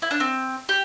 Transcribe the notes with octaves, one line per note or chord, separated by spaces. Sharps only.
E4
D4
C4
G4